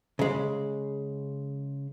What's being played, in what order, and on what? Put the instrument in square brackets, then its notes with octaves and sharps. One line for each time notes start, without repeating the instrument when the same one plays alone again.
[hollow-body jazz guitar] C#3 G#3